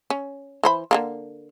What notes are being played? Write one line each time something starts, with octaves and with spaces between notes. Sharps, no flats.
C#4
E3 C5 B5
D3 F3 A#3